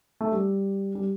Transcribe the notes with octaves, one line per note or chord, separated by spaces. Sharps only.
A3
G3
G3